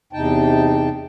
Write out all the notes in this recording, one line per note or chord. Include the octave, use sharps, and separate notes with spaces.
E2 C3 D#4 G5 A5